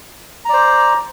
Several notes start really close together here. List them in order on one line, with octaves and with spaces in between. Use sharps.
A#5 D5 C5